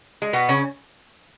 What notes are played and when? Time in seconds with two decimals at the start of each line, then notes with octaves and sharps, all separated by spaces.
0.22 G#3
0.33 B2 B3
0.49 C#3 C#4